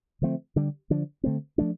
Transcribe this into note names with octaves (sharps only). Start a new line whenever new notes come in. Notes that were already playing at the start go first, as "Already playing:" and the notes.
D3 F3 A3 C4
D3 G3 D4
D3 F3 D4
D3 A3 C4
F3 A3 D4